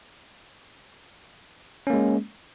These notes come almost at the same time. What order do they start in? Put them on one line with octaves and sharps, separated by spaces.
C#4 A#3 G#3